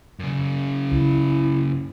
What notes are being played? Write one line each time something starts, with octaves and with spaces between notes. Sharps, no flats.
F#2 C#3
C#2 E4